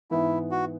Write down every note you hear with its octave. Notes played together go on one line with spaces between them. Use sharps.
G#2 E3 B3 E4
F#4